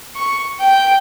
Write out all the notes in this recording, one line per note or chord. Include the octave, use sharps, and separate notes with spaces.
C#6
G5